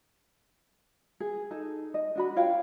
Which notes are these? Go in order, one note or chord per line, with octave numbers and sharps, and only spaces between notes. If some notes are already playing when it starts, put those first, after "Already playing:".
G#4
D#4 A4
D#5
D4 F#4 B5
F4 C#5 F5 G5